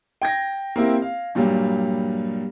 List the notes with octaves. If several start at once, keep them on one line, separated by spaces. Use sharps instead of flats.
G5 G#6 A#6
A#3 C4 E4 G4
F5
G2 A#2 F#3 G3